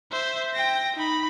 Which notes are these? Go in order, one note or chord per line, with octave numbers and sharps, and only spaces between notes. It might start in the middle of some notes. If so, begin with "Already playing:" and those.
C5 E5
G5 A#6
D#4 B5